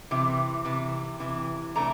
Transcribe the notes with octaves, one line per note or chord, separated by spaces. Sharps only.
C3 E3
C3 E3
C3 E3
C3 E3 A3 D4 A#5